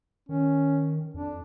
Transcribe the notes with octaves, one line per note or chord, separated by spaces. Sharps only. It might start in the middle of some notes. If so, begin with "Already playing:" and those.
D#3 C#4
F2 D4